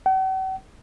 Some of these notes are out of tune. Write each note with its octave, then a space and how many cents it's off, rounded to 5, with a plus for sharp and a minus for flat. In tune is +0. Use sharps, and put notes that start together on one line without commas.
F#5 +45